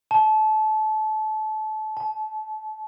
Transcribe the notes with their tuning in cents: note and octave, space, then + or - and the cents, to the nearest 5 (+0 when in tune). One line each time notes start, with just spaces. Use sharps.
A5 -25
A5 -40